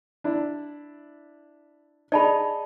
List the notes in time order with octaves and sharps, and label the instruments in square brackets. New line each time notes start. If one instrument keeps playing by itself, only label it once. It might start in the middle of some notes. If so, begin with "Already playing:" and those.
[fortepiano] D4 E4
[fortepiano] D#4 G#4 [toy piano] D5 A5 B5